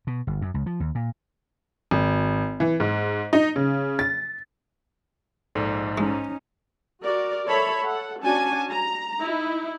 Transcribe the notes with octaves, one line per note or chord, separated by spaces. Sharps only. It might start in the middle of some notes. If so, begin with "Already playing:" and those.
B2
G1
F#2
C#2
F3
D#2
A#2
G#1
E3
G#2
D#4
C#3
A6
A#1 G#2 A4 D5
G#3 C#4 D#4
F#4 A#4 D5
A4 C#5 E5 A5 B5
A4 F#5
C#4 D4 F#4 G#5 A5
A#5
D#4 E4